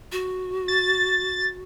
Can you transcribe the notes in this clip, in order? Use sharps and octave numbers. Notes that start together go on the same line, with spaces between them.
F#4
A6